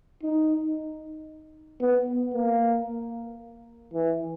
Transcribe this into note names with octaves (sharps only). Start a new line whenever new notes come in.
D#4
B3
A#3
E3